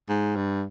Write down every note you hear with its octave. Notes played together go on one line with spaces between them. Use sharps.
G#2
G2